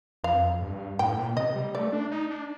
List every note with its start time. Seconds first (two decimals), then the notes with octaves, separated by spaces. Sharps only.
0.24 F2 F5
0.62 G2
0.99 A2 G5
1.18 A#2
1.36 C3 D#5
1.56 G3
1.75 A3 D5
1.93 D4
2.11 D#4
2.31 D4